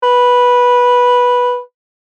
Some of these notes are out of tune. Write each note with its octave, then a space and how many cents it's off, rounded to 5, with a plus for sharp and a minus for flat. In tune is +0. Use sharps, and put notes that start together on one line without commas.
B4 -10